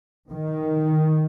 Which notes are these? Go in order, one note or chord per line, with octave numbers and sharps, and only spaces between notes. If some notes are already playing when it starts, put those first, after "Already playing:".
D#3